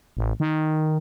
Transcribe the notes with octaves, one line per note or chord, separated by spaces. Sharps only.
A1
D#3